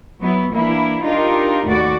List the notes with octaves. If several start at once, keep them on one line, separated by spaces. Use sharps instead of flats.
F#3 B3 E4
E3 A#3 D4 E4
D4 D#4 F4 G4 A#4
D#2 A2 A3 F#4 D5